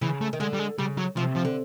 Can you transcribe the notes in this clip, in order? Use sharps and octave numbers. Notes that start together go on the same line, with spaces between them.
C#3 E3
A3
D#3
D3 G#3
G3
G#3
C#3 G3
F#3
C3 F3
F3
D3